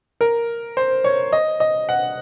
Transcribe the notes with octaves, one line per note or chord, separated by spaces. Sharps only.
A#4
C5
C#5
D#5
D#5
F#5